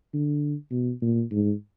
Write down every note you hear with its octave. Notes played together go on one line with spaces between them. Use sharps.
D3
B2
A#2
G#2